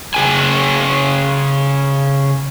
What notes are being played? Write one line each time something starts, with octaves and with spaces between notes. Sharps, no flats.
C#3 G#4 G5 G#5